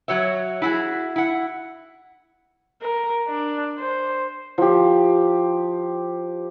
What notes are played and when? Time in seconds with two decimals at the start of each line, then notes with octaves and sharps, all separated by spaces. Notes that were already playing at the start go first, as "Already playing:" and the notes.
0.08 F#3 F#4 C#5 E5
0.62 E4 F#4 G#4
1.16 E4 F#5
2.82 A#4
3.28 D4
3.79 C5
4.58 F3 G4